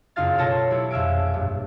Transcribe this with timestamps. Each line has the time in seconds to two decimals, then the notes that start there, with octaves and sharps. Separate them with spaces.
0.16 F#1 F#2 D#4 F4 F5 A6
0.38 B2 F4 A4 C#5 A5 A#6
0.71 F#3 B3 E4 G4
0.90 A#1 F2 E5 F5 G#5 D7
1.34 G2